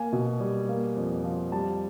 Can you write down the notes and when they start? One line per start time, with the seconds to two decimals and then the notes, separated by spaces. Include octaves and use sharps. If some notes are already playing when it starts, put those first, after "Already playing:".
Already playing: A#3 G#5
0.12 B2
0.40 G3
0.69 A#3
0.96 F2
1.24 F3
1.52 G3 A5